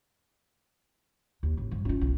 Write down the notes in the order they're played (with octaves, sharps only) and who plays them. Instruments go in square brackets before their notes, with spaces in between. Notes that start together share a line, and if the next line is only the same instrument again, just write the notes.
[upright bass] D#2
A1
G2 F3
C#4 F4
B1